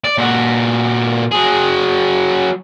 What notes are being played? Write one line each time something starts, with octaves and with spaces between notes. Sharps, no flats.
D5
A#2 F#4
F#3 G#4